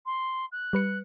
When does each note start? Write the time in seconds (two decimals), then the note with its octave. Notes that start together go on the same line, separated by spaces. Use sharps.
0.06 C6
0.52 F#6
0.73 G3 B4 C#7